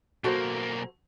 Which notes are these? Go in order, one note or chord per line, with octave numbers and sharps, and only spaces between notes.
B1 A#3 F#4 A4 C5